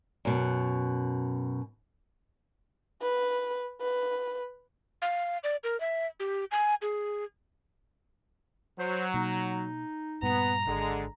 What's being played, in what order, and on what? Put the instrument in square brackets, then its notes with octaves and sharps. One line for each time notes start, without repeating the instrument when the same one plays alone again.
[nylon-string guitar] F#2 B2
[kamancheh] B4
B4
[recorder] F5
D5
A#4
E5
G4
G#5
G#4
[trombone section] F#3 [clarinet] C5
[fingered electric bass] B2 A#3 [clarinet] D#4
[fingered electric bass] G2 A#2 G3 [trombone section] B3 [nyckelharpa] A#5
[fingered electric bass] G#1 [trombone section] D3 G#3